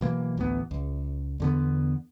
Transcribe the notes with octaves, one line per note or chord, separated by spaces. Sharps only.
B1 E3 A#3
A1 D2 E3 B3
C#2
E2 D3 B3